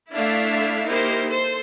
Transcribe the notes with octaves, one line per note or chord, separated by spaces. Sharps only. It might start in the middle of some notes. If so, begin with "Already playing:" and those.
A3 D4 E4 E5 F5
A#3 D#4 E4 G4 A#4 C5
A4 C5